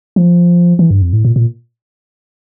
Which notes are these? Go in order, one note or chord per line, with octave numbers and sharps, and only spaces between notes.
F3
E3
G2
F2
A2
A#2
A#2